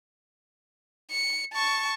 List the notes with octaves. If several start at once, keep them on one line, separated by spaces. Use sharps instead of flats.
C#7
A5 C#6